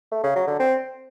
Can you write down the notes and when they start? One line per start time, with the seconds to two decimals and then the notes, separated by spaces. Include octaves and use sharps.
0.12 A3
0.24 C#3
0.36 F#3
0.47 D3
0.59 C4